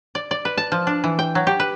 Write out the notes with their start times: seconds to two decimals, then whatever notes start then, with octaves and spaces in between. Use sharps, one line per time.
0.15 D5
0.31 D5
0.45 B4
0.57 A5
0.72 F3
0.87 D4
1.04 E3
1.19 G5
1.35 F#3
1.47 G4
1.60 B4